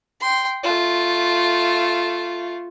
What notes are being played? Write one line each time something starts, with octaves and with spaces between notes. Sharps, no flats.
G5 C6
A3 F4